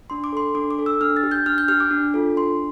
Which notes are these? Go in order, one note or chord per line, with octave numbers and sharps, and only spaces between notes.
D4 C6
D6
A4 C6
D4 D6
D6
A4
E6
D4 F6
A6
G4
G6
D4 F6
G6
G4 F6
D6
D4
F4 A4
D4 C6